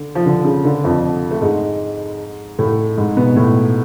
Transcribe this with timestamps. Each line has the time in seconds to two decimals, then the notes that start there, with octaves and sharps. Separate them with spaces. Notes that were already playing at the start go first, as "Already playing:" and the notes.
Already playing: D3
0.15 F3
0.26 D3
0.45 C#3
0.65 D3
0.84 F2 F3
1.31 A3
1.42 G#2 G#3
2.59 A2 A3
2.97 G#2 G#3
3.17 B2 B3
3.36 A2 A3